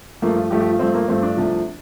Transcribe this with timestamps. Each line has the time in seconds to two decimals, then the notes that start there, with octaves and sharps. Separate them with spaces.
0.22 G2 F3 A3 A#3
0.36 F4
0.51 G2 F3 A3 G4
0.61 G4
0.70 F4
0.79 G2 F3 A3 C4
0.94 A#3
1.08 G2 F3 A3 C4
1.23 D4
1.37 C2 C3 F3 A3